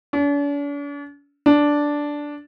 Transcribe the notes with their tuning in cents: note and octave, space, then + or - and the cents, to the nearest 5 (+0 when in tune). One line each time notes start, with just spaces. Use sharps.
D4 -45
D4 -5